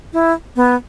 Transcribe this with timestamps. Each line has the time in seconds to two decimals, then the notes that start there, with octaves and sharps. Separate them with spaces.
0.13 E4
0.56 B3